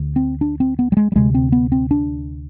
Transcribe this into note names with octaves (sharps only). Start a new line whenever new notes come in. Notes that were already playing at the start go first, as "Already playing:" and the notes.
Already playing: D2 D3
C4
D4
C4
B3
G3
G#3
G3
D2 C3 G#3
C4
B3
C4
D4